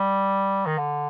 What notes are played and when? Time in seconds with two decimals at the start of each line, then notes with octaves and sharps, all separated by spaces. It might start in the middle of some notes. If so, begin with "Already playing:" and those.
Already playing: G3
0.66 D#3
0.78 D3